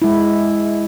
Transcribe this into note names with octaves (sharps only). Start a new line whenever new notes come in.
G#3 E4